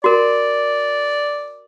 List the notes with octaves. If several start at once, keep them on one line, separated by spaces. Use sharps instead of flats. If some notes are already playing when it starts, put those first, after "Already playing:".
F#4 A#4 D5